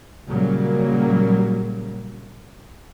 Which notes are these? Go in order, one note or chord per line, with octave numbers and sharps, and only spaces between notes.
A#2 C#3 F#3 G3 A#3